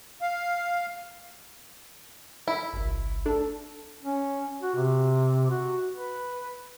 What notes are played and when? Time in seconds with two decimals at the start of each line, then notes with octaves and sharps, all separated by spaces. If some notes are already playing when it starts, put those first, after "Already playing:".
0.21 F5
2.48 E4 E5 B5
2.73 G1 C2
3.26 D4 A4
4.03 C#4
4.62 F#4
4.76 C3
5.50 F#4
5.94 B4